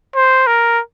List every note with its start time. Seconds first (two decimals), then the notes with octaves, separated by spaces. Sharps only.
0.15 C5
0.47 A#4